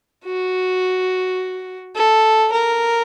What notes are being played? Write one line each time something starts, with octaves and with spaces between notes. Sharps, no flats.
F#4
A4
A#4